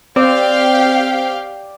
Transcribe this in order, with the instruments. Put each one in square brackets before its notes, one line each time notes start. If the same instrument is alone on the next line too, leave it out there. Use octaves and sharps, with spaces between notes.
[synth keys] C4 [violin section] G4 F5 G5 [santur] D5